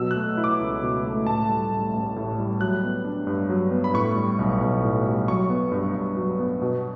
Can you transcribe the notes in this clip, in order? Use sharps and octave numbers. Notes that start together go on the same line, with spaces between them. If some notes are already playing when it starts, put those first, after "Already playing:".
Already playing: B2 F#3 E6
A3 F#6
E4
D6
C#2
B2
A3
A2 A5
G3
A1
A1
A2
G3
F#3 F#6
B3
D4
G2
F#3
B3
B5
A2 C#6
G3
B1
B1
A2
G3
F#3 C#6
B3
G2
G2
F#3
B3
B2